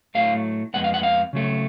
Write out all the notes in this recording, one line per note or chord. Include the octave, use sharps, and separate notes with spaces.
A2 F#3 A3 F5
F2 F3 G#3 B3 F#5
F5
F#5
F5
C#3 F#3 A3